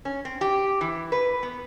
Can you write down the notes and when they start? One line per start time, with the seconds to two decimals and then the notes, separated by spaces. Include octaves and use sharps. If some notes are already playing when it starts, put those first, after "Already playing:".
0.05 C#4
0.25 C4
0.41 G4
0.81 E3
1.12 B4
1.43 B3